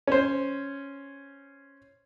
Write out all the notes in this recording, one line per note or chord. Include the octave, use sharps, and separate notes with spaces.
C#4 C5